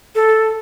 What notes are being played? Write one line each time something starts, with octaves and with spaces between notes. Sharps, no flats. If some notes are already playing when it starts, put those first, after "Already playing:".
A4